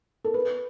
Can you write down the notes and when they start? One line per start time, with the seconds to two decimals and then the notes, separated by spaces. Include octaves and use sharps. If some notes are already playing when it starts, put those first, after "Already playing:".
0.24 A4
0.34 B4